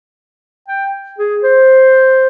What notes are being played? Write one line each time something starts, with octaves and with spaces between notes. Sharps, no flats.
G5
G#4
C5